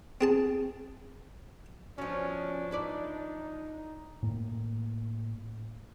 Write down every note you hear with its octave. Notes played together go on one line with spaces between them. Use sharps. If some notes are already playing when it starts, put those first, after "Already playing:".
C4 G#4 A5
B2 F3 C#4 D4
D#4 E4 B4 D5
A2 A#3